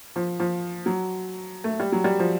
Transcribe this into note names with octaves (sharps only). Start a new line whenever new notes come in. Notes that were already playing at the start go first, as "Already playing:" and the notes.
F3
F3
F#3
A3
G3
F#3
G3
F3